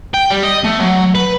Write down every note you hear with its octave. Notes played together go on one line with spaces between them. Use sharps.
G5
G3
D#5
A3
F#3
B4